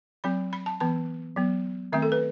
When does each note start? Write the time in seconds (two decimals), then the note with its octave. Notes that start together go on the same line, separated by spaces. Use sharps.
0.24 F#3 C4 B5
0.53 B5
0.66 A5
0.80 E3 B3 A5
1.36 F#3 B3
1.92 D#3 A3 C4 E5
2.02 A4
2.12 B4